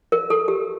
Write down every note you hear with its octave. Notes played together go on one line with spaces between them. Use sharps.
A#4
A4
G4